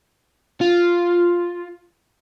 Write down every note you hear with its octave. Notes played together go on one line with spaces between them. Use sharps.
F4